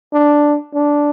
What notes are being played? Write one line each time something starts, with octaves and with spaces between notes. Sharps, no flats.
D4
D4